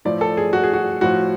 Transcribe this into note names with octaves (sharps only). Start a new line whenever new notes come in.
A2 F3 D5
A4
G#4
F#4
G#4
F#4
A2 F3 F#4